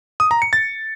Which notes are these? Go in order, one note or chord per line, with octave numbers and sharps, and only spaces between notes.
D#6
A#5
C#7
A6